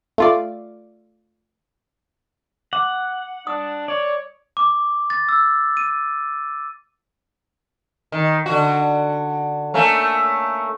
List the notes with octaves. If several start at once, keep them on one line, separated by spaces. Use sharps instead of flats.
A3 F4 D5
F#5 D6
D4 D#6
C#5 D5
D6
A6
E6
D#7
D#3
D3 F#4
A3 A#3 C#4